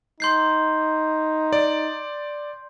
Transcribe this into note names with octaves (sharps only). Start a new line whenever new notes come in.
D#4 C6 G6 C7
D5